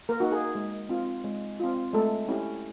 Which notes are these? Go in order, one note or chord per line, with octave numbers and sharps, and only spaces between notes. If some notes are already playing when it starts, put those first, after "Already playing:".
A#3 A#4
A#3 D#4 F#4
G#4
G#3
C4 F4
G#3
C4 F4
G#3 A3 A4
C#4 E4 G4